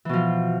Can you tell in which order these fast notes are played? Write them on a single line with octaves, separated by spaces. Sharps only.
E3 B2 F3